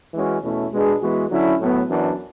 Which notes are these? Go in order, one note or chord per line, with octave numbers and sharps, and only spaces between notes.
E3 G#3 C#4 F#4
E2 B2 A3 C#4 E4
B2 G#3 D4 G#4 B4
E3 G#3 B3 F#4 B4
D3 F#3 C#4 E4
A2 F#3 B3
F#2 E3 B3 D4